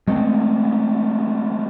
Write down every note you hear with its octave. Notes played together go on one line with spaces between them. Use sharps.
G#3 A3 C4